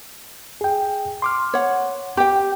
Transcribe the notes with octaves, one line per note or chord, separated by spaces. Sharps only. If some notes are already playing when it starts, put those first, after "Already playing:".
G#4 G5
C6 D6 F6
C#5 F#5
G4 G5